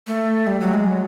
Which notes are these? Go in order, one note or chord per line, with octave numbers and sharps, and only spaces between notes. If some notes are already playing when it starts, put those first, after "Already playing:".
A3
G3
F#3
G#3
F#3